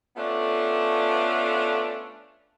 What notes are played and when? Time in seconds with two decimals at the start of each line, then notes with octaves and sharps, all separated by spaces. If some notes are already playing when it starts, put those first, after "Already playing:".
0.17 A3 B3 C#4 D4 F4 A4